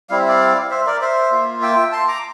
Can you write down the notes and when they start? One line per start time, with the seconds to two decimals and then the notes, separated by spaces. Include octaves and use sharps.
0.10 G3 C4 E4 F5
0.19 E5
0.28 D5 F5
0.70 C5 E5
0.86 A#4 D5
1.02 C5 E5
1.31 A#3 F4
1.62 E5 G5
1.92 A5 C6
2.08 A#5 D6